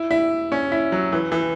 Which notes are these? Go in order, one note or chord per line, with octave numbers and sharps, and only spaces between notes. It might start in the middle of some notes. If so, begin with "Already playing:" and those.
Already playing: E4
E4
C#4
E4
F#3
E3
E3